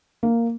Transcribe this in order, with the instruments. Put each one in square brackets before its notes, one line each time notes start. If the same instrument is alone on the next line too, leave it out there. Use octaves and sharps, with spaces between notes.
[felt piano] A#3